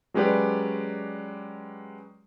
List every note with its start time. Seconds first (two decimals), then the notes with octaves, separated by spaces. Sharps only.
0.14 F#3 G#3 C#4 G4 B4 D5